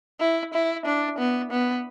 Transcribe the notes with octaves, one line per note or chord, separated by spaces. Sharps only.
E4
E4
D4
B3
B3